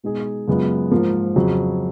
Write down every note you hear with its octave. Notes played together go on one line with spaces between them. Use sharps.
B2 G#3 D#4 G#4
F#2 C#3 G#3 B3 F4
G#2 F3 A#3
F2 C#3 F#3